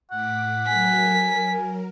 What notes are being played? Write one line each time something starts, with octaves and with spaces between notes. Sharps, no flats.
A2 F#5 D6 B6
F#3 A#4 G#5 B6